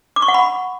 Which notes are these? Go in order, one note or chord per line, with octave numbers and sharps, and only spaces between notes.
D6
C#6
F#5
B5